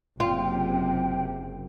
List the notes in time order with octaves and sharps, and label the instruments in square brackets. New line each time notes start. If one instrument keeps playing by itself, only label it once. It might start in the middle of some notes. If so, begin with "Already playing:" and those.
[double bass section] F#1 [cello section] C3 [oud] F4 [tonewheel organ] G5